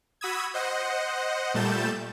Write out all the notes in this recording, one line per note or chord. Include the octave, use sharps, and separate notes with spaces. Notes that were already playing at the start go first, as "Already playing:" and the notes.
F#4 B5 D#6 E6 G#6
C5 D#5 F#5
A#2 G3 A3 G6 A6 E7